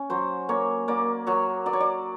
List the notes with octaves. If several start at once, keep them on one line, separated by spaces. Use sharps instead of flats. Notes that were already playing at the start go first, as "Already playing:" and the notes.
Already playing: C#4
F#3 C5
A#3 C#5
A#3 D5
F#3 C#5
F#3 D5
C#5
D5